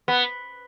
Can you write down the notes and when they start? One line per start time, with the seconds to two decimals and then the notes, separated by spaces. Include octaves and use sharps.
0.08 B3